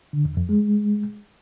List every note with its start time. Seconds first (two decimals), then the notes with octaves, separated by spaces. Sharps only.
0.13 D3
0.25 E2
0.37 F2
0.49 G#3